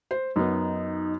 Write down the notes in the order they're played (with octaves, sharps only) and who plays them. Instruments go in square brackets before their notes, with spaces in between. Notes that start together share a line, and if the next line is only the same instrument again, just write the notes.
[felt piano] C5
[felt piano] F#2 B3 [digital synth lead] D#4